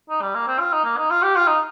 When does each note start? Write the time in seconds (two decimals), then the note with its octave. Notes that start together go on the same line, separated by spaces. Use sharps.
0.10 D#4
0.22 G3
0.35 A#3
0.48 C4
0.60 F4
0.73 D#4
0.85 A#3
0.97 D#4
1.10 F4
1.23 G4
1.36 F4
1.47 D#4